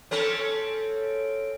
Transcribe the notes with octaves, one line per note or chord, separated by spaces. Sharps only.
C4 C#4 A4